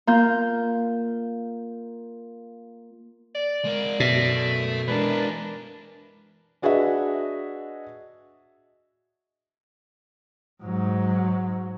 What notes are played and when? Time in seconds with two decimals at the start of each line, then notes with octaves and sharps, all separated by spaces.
0.07 A#3 F4 G6
3.35 D5
3.65 G#3 A#4
4.00 F#2 B2 A4 E5
4.88 E3 G#3 D4 A#4 B4
6.62 D4 F#4 G#4 B4 D#5 E5
10.63 G#2 F#3